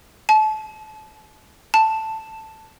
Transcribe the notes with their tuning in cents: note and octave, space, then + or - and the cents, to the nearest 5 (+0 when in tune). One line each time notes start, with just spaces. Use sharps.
A5 -30
A5 +5